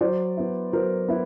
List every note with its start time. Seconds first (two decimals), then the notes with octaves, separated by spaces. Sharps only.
0.01 F#3 C5 D5
0.37 B3 E4
0.73 F#3 A#4 C5
1.08 B3 E4